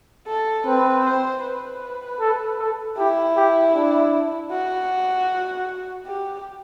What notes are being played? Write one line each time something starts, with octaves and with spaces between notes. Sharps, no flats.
A4
C4 B4
C5
B4
A4
A4
E4 G4
G4
D4
F#4
G4